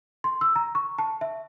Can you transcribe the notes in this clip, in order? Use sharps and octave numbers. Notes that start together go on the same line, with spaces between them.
C6
E6
A#5
C#6
A5
E5